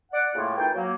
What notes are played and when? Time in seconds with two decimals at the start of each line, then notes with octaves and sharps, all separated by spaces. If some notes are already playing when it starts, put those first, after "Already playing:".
0.12 D5 F#5
0.35 A2 C#3 A3 A#3 F4
0.57 F#2 E3 D#4 F4 G5
0.74 F#3 A#3